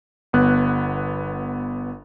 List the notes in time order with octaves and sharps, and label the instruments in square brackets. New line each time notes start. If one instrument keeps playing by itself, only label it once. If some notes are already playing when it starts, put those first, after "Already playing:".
[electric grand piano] G1 B3 F#6